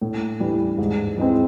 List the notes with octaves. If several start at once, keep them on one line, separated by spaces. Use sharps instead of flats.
A2
E3 G3
G#2
E3 G#3 C4